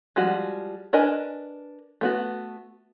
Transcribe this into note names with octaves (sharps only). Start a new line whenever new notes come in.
F3 G3 G#3 F#4
D4 A#4 B4 D#5 G#5
A3 B3 F#4